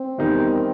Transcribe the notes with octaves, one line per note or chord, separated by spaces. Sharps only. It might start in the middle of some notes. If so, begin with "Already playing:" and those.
Already playing: C4
E2 D#3 G3 D#4